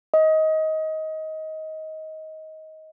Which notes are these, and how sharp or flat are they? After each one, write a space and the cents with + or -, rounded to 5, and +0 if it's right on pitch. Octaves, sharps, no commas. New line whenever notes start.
D#5 +20